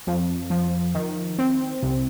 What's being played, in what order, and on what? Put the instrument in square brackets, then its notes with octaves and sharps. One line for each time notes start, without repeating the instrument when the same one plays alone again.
[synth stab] F2
F3
D#3
C4
C2